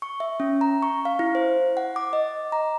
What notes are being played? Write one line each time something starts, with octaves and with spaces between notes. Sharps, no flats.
C#6
E5
C#4
A#5
C#6
F5
E4
C5
F#5
D6
D#5
A#5